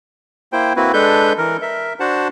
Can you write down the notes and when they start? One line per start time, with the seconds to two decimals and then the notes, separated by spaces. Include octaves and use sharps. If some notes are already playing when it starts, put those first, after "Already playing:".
0.53 A#3 E4 C5 G5
0.76 A#3 C4 E4 F#4 B4
0.93 G#3 D4 A4 B4 G6
1.38 E3 A#4
1.62 A#4 E5
2.00 D4 F#4 C5 F#5 A5